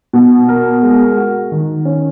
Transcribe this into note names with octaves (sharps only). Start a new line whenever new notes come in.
B2
A#4
G#3
F#4
D#3
C#4